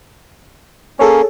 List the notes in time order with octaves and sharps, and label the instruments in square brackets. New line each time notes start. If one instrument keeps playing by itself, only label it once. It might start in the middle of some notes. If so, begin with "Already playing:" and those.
[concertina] A#3 C#4 [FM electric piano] G#4 A4 C#5